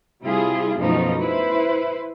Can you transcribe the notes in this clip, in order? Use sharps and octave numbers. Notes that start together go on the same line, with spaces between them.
C3 G3 E4 F4 G#4
F#2 B2 F3 A3 D#4
E4 B4 C5